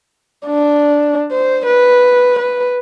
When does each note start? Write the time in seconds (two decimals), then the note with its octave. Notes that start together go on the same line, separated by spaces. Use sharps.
0.47 D4
1.32 C5
1.67 B4
2.39 B4